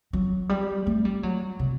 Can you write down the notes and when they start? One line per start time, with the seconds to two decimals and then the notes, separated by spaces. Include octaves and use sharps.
0.13 F#3
0.49 G3
0.87 A3
1.05 G3
1.23 F#3
1.59 C3